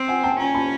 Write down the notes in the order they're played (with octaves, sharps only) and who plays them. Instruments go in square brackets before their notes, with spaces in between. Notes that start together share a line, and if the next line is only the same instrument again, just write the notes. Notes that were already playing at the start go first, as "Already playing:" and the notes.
Already playing: [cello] C4
[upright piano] F#5 G#5
G5 A5
[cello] C#4 [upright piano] G#5 A#5
[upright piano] A5 B5